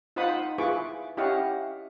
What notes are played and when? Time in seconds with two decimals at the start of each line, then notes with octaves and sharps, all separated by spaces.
0.16 D#4 F4 C5 F#5 B5 D#6
0.58 E4 F4 G#4 B4 C#6 D6
1.17 C#4 E4 G4 D#5 F5 F#5